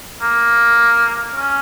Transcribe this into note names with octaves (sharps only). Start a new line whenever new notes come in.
A#3
C#4